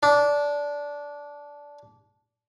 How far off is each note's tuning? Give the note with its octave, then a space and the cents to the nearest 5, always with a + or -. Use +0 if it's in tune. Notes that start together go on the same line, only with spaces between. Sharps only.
D4 -15